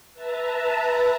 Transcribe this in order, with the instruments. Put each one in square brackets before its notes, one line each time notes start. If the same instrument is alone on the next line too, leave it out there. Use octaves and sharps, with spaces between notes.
[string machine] B4 E5 A5 A#5